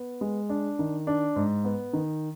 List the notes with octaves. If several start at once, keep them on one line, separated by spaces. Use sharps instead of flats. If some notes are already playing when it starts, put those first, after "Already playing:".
Already playing: B3
G#3
D4
D#3
D4
G#2
B3
D#3